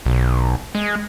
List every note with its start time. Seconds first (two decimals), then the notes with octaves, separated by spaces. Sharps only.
0.06 B1
0.75 G#3